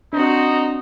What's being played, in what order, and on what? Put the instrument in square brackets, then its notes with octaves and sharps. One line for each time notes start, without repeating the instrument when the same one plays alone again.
[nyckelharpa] C4 F#4 [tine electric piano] D4 [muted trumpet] D#4